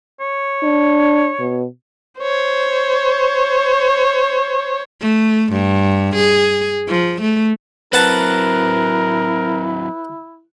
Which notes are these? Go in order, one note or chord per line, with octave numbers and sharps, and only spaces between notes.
C#5
D4
B2
C5 C#5
A3
G2
G#4
F3
A3
F#3 C4 E4 A#4 B4 F#5 A5